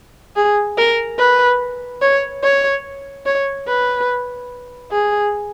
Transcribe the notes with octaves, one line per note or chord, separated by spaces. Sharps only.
G#4
A#4
B4
C#5
C#5
C#5
B4
G#4